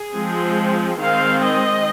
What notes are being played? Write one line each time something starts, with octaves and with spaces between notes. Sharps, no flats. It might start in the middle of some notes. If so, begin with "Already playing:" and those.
Already playing: G#4
F3 G#3 C4
D#3 G#3 C4 F5
D#5